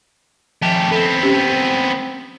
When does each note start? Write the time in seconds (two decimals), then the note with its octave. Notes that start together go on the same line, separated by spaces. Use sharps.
0.62 D#3 F3 A3 G4
0.91 B3 C4 A4
1.23 C#4 G4 E6